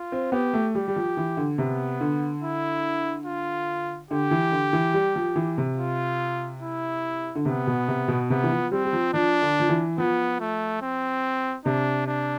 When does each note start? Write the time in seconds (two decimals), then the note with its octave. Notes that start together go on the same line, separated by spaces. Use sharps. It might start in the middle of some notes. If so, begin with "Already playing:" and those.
Already playing: F4
0.12 C4
0.32 B3 G4
0.54 A3
0.75 G3 G4
0.88 G3
0.96 F3
1.17 E3
1.37 D3
1.58 C3 B3
2.01 D3
2.42 E4
3.26 F4
4.11 D3 G4
4.31 E3
4.52 D3
4.73 E3
4.94 G3
5.16 F3
5.36 E3
5.58 C3
5.78 F4
6.62 E4
7.35 D3
7.45 C3 B3
7.67 B2
7.88 C3
8.08 B2
8.30 C3 B3
8.44 E3
8.51 F3
8.71 G3 C4
8.85 G3
8.93 F3
9.13 F3 D4
9.42 D3
9.60 F3
9.69 E3
9.98 F3 B3
10.40 A3
10.82 C4
11.65 C3 D4
12.07 D4